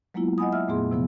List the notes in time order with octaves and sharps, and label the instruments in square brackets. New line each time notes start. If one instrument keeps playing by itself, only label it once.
[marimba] F#3 G#3 A#3 B3 E4 F4
D#5 F#5 G#5 B5 D#6
E5 E6 F6
F2 A#2 A3 B3 G#4 C6
C3 F3 B3